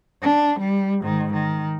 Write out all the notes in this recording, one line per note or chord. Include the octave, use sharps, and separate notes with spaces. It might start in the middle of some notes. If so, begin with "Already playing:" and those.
D4
G3
G#2 D#3
D#3